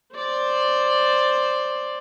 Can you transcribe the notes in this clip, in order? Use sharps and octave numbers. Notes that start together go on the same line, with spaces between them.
C5 D5